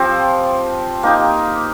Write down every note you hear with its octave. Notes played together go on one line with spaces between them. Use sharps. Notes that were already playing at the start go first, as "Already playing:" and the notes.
Already playing: F3 C4 G4
A#3 D#4 G4